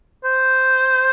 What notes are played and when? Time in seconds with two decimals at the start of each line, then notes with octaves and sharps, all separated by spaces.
0.25 C5